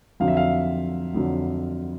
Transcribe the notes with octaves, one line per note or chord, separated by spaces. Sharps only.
F2 D3 F#3 F5
E5
F5
F2 D3 F#3